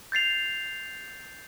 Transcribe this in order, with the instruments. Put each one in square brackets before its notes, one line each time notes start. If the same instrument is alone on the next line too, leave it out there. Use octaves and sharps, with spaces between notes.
[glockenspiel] G6 A6 C7 F7